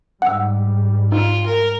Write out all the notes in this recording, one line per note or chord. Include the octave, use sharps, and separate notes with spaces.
G#2 G3 F#5 E6
D#4 F4
A#4